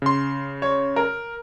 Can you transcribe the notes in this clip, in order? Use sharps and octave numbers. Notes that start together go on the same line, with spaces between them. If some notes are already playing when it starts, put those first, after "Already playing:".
C#3 C6
C#5
A#4